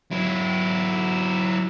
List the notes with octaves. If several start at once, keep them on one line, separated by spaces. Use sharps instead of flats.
F#3 E4